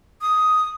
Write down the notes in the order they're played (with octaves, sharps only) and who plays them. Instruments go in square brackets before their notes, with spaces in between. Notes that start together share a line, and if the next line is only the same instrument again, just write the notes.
[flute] D#6